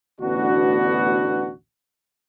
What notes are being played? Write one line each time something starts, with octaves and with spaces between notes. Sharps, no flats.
A1 D2 B2 B3 D4 F#4